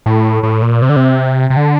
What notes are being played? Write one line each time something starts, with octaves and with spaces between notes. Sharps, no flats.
A2
A2
A#2
C3
D3
C3
C3
D3